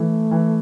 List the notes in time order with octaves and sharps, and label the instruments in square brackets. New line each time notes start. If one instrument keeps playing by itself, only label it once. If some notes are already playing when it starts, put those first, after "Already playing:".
Already playing: [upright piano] E3 [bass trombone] A3
[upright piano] E3